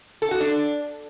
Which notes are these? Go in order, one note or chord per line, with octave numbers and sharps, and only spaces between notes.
A4
F#4
D4